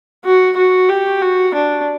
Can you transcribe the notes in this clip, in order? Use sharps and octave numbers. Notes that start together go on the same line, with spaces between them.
F#4
F#4
G4
F#4
D4